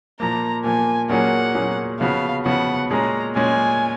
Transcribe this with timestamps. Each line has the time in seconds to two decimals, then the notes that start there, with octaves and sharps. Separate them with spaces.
0.20 A#2 F3 A#3 A#5
0.64 A#2 F3 A#3 G#5
1.09 A#2 F#3 A#3 C#4 G#4 F#5
1.55 A#2 F#3 A#3 C#4 G#4
2.00 C#3 F3 B3 F#4 F5
2.46 C#3 F3 B3 F#4 F#5
2.90 A#2 G#3 C#4 G#4 A#5
3.36 A#2 G#3 C#4 G#4 G#5